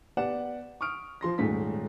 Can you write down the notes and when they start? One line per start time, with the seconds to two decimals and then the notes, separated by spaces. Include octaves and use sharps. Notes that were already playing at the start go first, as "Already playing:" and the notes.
0.17 B3 G4 D5 F#5 E7
0.81 C#6 D#6 F6 D7
1.21 F3 C6 A#6
1.38 D#1 G#2 A3 C#4 B6